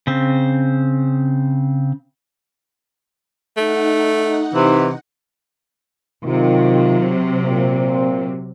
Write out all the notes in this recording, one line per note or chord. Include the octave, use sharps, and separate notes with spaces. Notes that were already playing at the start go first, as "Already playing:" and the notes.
C#3 C4
A3 D#4 F#5
C3 E3
C3 D#3 F#3 F4
A#2 C4